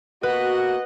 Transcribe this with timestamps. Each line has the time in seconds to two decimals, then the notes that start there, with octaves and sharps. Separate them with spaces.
0.23 A#3 B3 F#4 B4 D#5 F#5